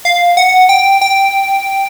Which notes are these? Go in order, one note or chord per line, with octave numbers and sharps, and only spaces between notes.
F5
F#5
G5
G5